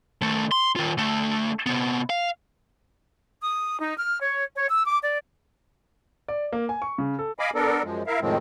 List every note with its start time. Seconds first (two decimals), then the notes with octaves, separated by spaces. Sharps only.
0.22 D#3 A3
0.51 C6
0.76 D#3 F4
0.98 D2 A3
1.66 C3 B3
2.10 F5
3.41 D#6
3.78 D#4
3.97 F6
4.21 C#5
4.55 C#5
4.69 E6
4.85 D6
5.02 D5
6.28 D5
6.52 A#3
6.69 G#5
6.82 C#6
6.98 C#3
7.19 A4
7.39 D#5 F5 G#5 B5 D6
7.55 B3 D4 A4 A#4
7.83 F#2 F3 G#3
8.07 E4 A#4 E5 F5
8.21 F2 A2 D#3 F3 G#3 C4